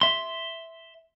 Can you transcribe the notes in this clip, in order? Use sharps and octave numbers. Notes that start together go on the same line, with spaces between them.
E5 C6